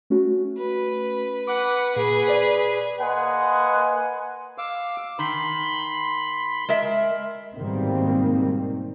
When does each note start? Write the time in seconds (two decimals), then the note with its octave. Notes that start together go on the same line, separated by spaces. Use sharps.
0.10 A3 C#4 F#4
0.58 B4
1.47 B4 F#5 D6 F#6
1.96 A#2 G#4 B4
2.28 C5 D5
3.00 A#3 B4 D#5 F#5 G#5 C6
4.58 F5 D6 E6
5.19 D#3 B5 C6
6.68 G#3 A#4 E5
7.55 G#2 B2 D#3 G3 A#3 C4